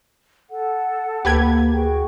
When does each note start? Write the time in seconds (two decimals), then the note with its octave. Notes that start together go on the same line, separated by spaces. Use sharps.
0.50 A4 F#5
1.25 D2 A#3 G4 B4 G#6
1.72 F#4 G#4 G5